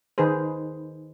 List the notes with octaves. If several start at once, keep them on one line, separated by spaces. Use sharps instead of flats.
D#3 D#4 G#4 B4 C5